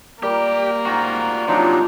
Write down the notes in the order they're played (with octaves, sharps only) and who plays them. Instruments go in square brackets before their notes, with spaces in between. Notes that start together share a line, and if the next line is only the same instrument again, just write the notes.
[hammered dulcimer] G3 A#4 D5 [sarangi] A#3 [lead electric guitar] G4
[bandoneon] G#2 [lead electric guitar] F4 F#4 [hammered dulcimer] G5 A#5
[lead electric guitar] C3 [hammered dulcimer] F3 [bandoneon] F#3 D4 D#4